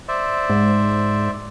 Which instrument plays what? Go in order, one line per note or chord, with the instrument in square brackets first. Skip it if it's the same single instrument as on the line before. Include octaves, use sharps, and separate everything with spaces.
[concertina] C5 D5 E5
[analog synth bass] G#2